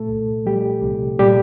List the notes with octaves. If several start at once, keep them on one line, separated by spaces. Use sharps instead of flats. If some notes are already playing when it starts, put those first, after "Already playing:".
Already playing: A#2 A3 A4
C2
F3 G3 G4
C2
A#2 G3 G4